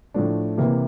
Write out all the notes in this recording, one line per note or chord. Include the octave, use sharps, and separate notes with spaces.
A2 F3 A3 D4
C3 E3 A#3